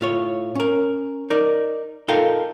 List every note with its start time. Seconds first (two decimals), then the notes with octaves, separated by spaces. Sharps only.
0.01 A2 F4 C#5
0.55 C#4 A#4
1.30 D#4 A#4 D5
2.08 D#4 F4 A4 A#4 F5 G5